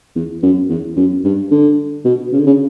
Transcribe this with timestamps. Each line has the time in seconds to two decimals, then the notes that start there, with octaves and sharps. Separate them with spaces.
0.15 E2
0.43 F#2
0.70 E2
0.97 F#2
1.24 G2
1.51 D3
2.05 B2
2.32 C#3
2.39 D3
2.47 C#3